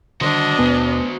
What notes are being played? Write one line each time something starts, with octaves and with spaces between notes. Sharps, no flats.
D3 D#3 G3 D4 F#4 C5 D#5
D#2 B2 B3 B4 G#5